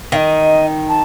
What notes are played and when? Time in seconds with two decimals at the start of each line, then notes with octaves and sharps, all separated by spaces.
0.12 D#3 F5
0.16 D#5
0.89 A5